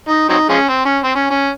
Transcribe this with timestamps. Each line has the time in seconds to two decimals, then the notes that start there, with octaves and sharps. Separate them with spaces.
0.08 D#4
0.29 F#3 C4 D#4
0.49 F3 G#3 C#4
0.69 C4
0.85 C#4
1.04 C4
1.15 C#4
1.30 C#4